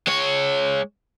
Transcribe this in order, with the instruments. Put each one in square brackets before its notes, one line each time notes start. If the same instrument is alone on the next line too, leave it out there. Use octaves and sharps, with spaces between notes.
[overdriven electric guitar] G#3 C#5